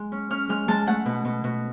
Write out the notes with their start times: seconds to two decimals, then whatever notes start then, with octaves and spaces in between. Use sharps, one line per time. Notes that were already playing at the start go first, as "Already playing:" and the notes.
Already playing: G#3
0.12 C#4
0.30 C#4 F6
0.49 G#3 F6
0.68 G#3 A5
0.87 A3 F#5
1.06 B2
1.25 B2
1.44 B2